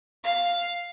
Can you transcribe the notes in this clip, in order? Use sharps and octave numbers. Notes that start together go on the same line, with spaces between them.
F5